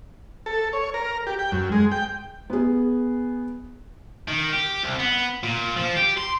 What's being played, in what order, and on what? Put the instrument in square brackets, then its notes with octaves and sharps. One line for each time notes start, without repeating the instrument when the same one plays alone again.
[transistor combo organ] A4
C#5
A#4
G4
G5
F#2
G#3
G5
[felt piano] B3 G#4
[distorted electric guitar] D#3
G4
C2
B3
A#2
F3
G4
C6